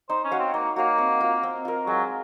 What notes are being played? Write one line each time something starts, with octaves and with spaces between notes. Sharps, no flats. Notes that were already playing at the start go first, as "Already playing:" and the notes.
D#4 C5
C#4
F#4 C#5 F5
C4
A#3 D#4
A#3 F#4 C#5 F5
C4
F4 A#4
C4
F4 A#4
F#3 G#3